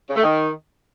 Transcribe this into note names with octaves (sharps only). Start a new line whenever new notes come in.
C#3
A3
D#3